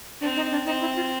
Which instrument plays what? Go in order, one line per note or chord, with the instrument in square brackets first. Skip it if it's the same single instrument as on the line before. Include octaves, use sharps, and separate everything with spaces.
[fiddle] C4 [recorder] D4
[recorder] D#4
D4
[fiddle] C4 [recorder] D#4
[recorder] E4
F4